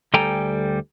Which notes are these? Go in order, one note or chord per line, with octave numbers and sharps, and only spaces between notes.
D2 G3 A4 G5 G#5 A#5